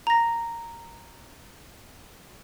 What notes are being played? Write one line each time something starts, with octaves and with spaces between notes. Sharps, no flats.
A#5 A#6